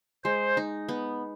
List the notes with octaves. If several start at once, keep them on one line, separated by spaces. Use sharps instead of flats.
G#3 C5
D#4
B3